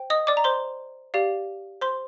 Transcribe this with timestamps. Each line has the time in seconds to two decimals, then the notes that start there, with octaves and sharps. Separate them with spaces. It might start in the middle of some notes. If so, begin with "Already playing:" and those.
Already playing: C5 G5
0.10 D#5 D#6
0.27 D5 D6
0.37 A#5
0.44 C5 C6
1.14 G4 D5 F5
1.81 C5 C6